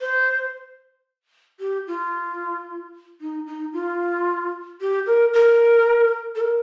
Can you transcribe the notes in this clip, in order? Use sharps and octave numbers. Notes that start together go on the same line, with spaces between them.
C5
G4
F4
D#4
D#4
F4
G4
A#4
A#4
A4
A#4